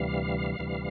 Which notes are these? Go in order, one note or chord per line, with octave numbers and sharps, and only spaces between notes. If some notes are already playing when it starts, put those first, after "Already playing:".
Already playing: D2 C3 E3 G3 F5
D2 C3 E3 G3